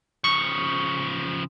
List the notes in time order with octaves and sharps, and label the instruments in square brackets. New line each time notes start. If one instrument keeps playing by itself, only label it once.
[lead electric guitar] C#3 F3 [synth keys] C#6